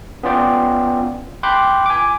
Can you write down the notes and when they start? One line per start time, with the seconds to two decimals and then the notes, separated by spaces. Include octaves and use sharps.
0.23 B3 C#4 F4 D5 G5
1.43 G5 B5 C6 D6 F#6 G6
1.86 G#5 D6